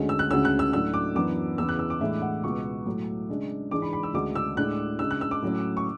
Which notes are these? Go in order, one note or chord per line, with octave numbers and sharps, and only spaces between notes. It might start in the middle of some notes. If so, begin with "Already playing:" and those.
Already playing: D2 D3 G#3 C#4
E6
F#6
D2 C#3 G#3 C#4 E6
F#6
E6
A2 F#3 A3 D4 E6
D6
F#2 E3 B3 D4 D6
E2 C#3 E3 B3 E6
F#6
E6
D6
A2 E3 G#3 D4 E5
F#5
C#2 B2 G#3 B3 C#6
A2 F#3 A3
C#3 G#3 D4
G#2 E3 G#3 D4 D6
B5
B5
E6
D2 C#3 G#3 D4 D6
E6
A2 G#3 D4 F#6
C#3 G#3 D4 E6
F#6
E6
D6
A2 F#3 C#4
C#6